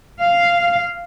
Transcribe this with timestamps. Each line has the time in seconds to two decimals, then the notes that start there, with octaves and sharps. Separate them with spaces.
0.20 F5